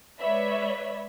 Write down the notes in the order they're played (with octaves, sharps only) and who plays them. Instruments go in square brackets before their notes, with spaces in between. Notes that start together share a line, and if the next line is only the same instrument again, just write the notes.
[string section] G#3 B4 C#5 D5 E5 B5